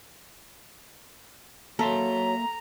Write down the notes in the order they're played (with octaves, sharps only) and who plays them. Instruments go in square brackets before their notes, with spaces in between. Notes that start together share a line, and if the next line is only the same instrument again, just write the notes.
[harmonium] F#3 [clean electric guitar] A#3 E5 C6 [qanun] A4 [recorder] A#5